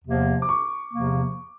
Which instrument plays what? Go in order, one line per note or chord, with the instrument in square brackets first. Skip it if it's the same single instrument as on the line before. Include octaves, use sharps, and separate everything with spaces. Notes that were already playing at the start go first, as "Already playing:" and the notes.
[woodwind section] E2 C3 F3 A#3
[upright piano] D6
C#6
[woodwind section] E2 C3 F3 A#3